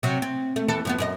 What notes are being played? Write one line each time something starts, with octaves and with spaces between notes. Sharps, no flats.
C3 F#3
C4
A3
D#2 E3 A4
F#2 F3 B3
F#2 A#4 D#5